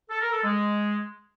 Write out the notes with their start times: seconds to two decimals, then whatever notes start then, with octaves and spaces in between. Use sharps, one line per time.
0.10 A4
0.21 A#4
0.32 A4
0.43 G#3